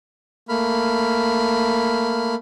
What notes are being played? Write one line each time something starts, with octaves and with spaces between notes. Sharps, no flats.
A3 A#3 B5 F6